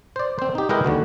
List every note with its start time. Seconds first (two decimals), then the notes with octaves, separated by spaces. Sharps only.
0.16 C5 D5
0.39 C4 C5
0.55 D#4 G4
0.69 G#3 E4 A#4 B4 D#5 G5
0.85 D#2 D3 F#4